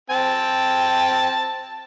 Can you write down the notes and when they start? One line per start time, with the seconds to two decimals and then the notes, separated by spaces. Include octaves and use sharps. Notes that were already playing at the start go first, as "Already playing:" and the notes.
0.10 C4 G5 A5